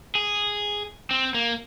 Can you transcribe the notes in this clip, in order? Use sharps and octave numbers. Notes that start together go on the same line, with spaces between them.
G#4
C4
A#3